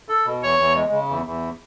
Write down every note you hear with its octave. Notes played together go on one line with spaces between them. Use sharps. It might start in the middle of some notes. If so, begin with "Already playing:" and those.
A4
B2
E2 C#5
E2
G#3
C#3
E2
E2